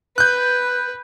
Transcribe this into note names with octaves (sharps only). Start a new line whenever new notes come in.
B4 F#6 G6